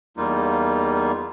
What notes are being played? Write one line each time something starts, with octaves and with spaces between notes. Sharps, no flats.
E2 G3 A#3 D#4 F4